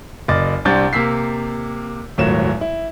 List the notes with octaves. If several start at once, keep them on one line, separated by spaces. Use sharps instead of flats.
F#1 D5 D#5 D6 A6
C2 C3 C4 D4 G6 A6
C3 A#3 E6 B6 C7
D#1 G#1 A2 F#3 E7
E4